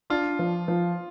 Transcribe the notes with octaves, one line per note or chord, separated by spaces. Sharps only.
D4 F4
F3
F3